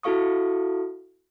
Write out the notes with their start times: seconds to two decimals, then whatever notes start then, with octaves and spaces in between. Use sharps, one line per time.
0.03 E4 F#4 A4 F5 C#6 D#6